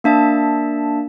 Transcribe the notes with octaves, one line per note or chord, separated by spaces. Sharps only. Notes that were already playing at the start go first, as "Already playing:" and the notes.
A#3 D4 E5 A5